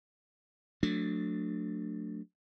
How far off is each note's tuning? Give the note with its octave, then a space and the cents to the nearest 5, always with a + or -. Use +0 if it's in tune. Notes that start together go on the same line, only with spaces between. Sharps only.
F#3 -30 A3 +10 D4 +0